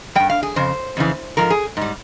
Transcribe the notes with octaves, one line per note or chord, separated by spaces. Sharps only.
G2 G3 G5
F5
G#4
F2 C#3 C5
F2 C#3 E3
G#2 F3 A#4
G#4
G#2 G3